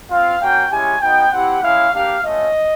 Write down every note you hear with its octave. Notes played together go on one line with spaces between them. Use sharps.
C4 F4 F5
A#3 C#4 F#4 G5
G#3 C#4 E4 G4 G#5
B3 D#4 F#4 G5
C4 E4 G4 F#5
G#3 C#4 E4 F5
A#3 D4 G4 F5
A3 C#4 F4 D#5